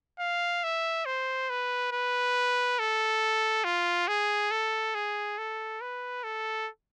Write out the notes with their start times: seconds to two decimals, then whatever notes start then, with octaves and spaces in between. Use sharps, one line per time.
0.19 F5
0.64 E5
1.06 C5
1.50 B4
1.92 B4
2.79 A4
3.64 F4
4.08 G#4
4.51 A4
4.95 G#4
5.38 A4
5.81 B4
6.24 A4